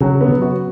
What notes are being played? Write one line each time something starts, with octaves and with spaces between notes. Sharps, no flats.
C#3 F#3
B3
F#4